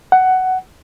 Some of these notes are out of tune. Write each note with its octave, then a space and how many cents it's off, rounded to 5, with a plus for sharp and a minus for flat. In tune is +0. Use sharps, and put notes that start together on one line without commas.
F#5 +10